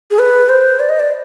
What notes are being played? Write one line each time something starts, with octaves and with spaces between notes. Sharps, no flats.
G#4
B4
C5
D5
D#5
D5